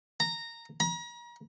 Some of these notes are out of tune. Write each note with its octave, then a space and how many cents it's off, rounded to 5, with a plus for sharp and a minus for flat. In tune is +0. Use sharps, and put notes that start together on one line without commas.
A#5 -10
A#5 +40